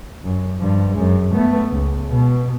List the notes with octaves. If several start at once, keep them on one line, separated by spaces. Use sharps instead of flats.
F#2
G2 F3
F#2 G#3
A3 B3
C#2
B2